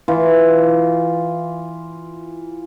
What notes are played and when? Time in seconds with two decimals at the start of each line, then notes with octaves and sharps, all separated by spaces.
0.08 E3 F4